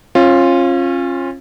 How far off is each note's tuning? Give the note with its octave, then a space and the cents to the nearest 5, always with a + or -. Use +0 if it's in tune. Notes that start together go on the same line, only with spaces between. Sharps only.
C#4 -35 F4 +0